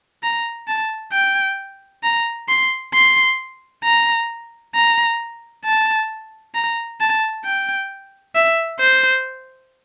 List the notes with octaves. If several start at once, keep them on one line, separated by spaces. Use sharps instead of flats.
A#5
A5
G5
A#5
C6
C6
A#5
A#5
A5
A#5
A5
G5
E5
C5